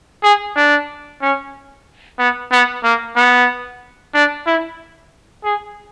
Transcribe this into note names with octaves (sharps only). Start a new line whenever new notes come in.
G#4
D4
C#4
B3
B3
A#3
B3
D4
E4
G#4